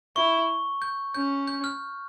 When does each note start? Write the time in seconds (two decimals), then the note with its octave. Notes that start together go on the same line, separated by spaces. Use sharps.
0.16 E4 C#6
0.82 G6
1.15 C#4 G6
1.47 G6
1.64 F6